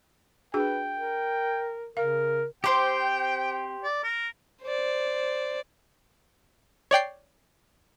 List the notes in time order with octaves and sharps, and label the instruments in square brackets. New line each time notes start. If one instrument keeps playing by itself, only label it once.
[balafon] D4 F#4 G#4 [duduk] B4 [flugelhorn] G5
[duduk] A#4
[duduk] C#3 [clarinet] A#4 [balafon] F5
[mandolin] C4 C6 D6 [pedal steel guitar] G4 C5 [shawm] G5
[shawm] D5
A#4
[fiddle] C5 D5
[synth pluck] C#5 D5 G5 C7